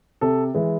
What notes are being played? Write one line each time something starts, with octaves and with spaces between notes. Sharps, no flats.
C3 A4
E3 G#3